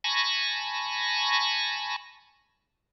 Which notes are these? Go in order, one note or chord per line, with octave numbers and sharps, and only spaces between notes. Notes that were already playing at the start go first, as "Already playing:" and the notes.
G#5 A5 B5 C#6 A#6